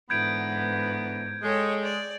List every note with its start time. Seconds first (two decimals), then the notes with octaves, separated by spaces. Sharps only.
0.10 G#2 D3 E3 B3 G6 G#6 D7
1.43 G#3 A4 C#5 G5
1.82 D5